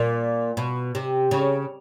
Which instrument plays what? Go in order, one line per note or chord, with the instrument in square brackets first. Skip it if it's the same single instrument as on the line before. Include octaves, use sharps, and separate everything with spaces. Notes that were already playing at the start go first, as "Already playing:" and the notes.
Already playing: [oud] A#2
B2
C3
C#3